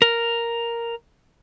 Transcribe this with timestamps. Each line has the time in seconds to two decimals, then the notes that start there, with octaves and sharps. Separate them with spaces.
0.02 A#4